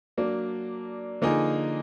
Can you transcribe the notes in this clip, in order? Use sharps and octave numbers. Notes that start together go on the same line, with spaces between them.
F#3 A#3 D4
D3 F3 A#3 D#4 G#4